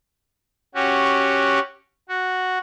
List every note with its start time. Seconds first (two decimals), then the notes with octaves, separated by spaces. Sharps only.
0.75 C#4 F#4 G4
2.09 F#4